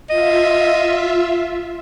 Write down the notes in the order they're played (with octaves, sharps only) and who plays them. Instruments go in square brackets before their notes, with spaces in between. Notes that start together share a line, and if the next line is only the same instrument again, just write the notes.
[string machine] F4 E5 [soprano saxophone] D#5